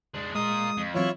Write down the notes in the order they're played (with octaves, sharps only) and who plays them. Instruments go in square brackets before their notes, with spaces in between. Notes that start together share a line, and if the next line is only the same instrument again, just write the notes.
[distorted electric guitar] G#3 D4
[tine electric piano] G#3 [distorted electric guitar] F4 A#4 [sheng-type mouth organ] D#6
[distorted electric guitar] F2
[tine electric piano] E3 F#3 C4 [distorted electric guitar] E4 [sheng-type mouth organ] F4 C#5